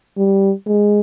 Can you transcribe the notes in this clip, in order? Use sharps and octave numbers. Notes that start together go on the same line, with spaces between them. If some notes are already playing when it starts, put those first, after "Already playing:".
G3
G#3